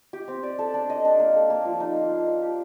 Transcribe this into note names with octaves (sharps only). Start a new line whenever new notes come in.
G4
C4
D5
A4
D4
D#5
D4
A#3
A4
A#3
F3
D#4
F4
D4
A#4
G4